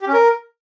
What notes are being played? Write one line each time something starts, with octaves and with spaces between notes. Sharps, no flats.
G4
C#4
A#4